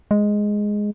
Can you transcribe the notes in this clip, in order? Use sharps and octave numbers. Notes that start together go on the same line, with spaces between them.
G#3